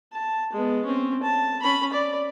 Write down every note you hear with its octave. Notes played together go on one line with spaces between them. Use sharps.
A5
G#3 B3
C4 C#4
A5
C#4 B5
D5